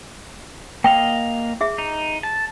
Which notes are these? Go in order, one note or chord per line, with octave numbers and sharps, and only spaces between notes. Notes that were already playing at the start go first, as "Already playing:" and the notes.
A#3 D#5 F5 G5
G#4 E5
D#4
A5